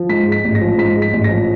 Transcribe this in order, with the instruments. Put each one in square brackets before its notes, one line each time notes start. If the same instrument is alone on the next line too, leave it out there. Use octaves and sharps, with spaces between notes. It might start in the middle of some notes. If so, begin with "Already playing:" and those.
Already playing: [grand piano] F3
G#2 B6
G#3
B6
A1
A#6
F3
G#2 B6
G#3
B6
A1
A#6
F3